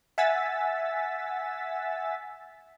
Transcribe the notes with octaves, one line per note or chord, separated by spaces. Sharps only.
E5 F#5 G#5 E6 A6 B6